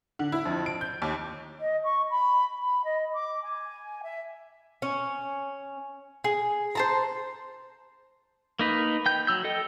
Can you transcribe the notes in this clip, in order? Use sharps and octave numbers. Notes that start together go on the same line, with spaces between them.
D3
E4
F2
D7
G6
D#2
D#5
C#6
B5
B5
D#5
D6
G#5
E5
C#4
G#4
C5 A5 A#5
A#3 D#4 B4
G5 G6
F#3 E6 G6
A4 D#5 G5